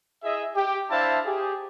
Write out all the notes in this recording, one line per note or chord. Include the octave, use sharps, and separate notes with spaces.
E4 G#4 D#5 E5
G4
D4 E4 C5 E5 F5 A5
G4 G#4